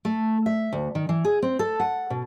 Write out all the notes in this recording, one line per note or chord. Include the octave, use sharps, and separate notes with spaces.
A3
E5
D2
D#3
E3
G#4
C4
A4
F#5
B2